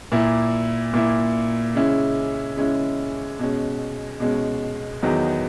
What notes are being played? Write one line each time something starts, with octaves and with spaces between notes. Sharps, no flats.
A#2 A#3 E4
A#2 A#3 E4
C#3 G#3 C#4 E4
C#3 G#3 C#4 E4
B2 G#3 C#4
B2 G#3 C#4
E2 D#3 F#3 B3 D#4